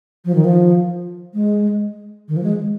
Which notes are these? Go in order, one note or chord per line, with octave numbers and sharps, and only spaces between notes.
F3
D#3
F3
G#3
D#3
F3
G#3